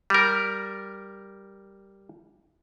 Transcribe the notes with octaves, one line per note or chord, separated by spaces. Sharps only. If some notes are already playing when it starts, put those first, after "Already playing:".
G3 A#4